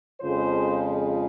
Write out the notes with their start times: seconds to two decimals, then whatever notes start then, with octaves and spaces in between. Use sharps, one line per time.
0.21 F2 C#3 F3 G#3 C5